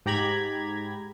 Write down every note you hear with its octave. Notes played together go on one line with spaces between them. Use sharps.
G#2 G4 A#5 B5 G#6